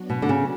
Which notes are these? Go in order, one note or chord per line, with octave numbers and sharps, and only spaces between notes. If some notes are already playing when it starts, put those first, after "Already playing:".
Already playing: F#3 B3 D4 F#4
B2
D3
C#3